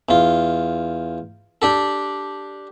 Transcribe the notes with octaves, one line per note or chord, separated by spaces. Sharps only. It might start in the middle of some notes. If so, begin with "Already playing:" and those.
E2 F4
D4 G4 A4